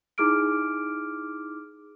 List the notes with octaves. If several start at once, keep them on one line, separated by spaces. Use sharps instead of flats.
D#4 E4 G#4 D6 F6 D7